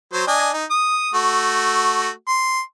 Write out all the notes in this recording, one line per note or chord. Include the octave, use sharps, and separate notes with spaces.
F#3 C5
D4 D#5 G#5
D#4
D#6
A3 F#4
C6